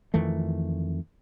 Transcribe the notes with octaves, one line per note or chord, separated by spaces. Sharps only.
F2 D#3 E3 A3